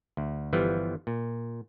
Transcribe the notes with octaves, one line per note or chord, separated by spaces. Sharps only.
D2
G1 E3 F3 G3 B3
A#2